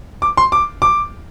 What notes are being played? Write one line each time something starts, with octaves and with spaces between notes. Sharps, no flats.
D6
C6
D6
D6